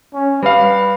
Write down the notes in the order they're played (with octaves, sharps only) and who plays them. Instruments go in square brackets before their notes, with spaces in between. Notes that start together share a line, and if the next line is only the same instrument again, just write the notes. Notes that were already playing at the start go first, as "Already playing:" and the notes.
[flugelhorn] C#4
[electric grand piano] G3 F5 [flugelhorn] B4